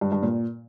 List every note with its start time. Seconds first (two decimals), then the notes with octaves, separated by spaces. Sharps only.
0.01 G2
0.12 G2
0.22 A#2